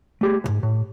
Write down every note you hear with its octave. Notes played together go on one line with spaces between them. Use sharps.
A3 G4 G#4
B1 G#2
A2